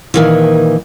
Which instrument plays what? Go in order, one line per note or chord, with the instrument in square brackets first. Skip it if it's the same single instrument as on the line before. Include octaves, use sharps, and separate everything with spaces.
[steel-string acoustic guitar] A#2 D#3 E3